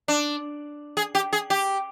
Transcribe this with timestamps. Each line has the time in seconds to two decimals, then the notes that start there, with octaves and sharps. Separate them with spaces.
0.08 D4
0.97 G#4
1.15 G4
1.33 G#4
1.50 G4